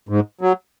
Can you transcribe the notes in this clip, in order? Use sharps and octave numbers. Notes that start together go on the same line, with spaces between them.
G#2
F#3